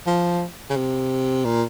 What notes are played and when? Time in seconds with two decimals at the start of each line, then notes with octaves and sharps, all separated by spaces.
0.07 F3
0.70 C#3
0.77 C3
1.44 A#2